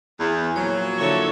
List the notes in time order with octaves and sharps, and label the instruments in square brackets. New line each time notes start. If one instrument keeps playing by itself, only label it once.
[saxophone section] E2
[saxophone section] A#2 F3 F#3 [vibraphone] C#5
[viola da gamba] D3 A4 C#5 [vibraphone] E4 E5